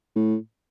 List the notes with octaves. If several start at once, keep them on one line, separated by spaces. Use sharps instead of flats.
A2